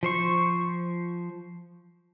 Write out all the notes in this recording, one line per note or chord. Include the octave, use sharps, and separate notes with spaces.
F3 C5 C#6